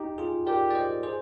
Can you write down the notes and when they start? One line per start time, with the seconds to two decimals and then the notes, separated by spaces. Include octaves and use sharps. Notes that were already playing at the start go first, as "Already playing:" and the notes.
Already playing: D#4 G4
0.18 F4 G#4
0.47 G4 A#4 D5
0.71 D5
0.75 C5 D#5
1.03 G#4 C5